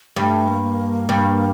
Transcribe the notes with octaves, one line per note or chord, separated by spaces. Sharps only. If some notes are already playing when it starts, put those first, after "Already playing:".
G2 A3
A#3
G2